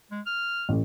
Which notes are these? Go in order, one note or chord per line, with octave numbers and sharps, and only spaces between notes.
G#3
F6
A1